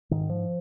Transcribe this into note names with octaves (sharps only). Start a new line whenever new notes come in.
G#2 D#3
F3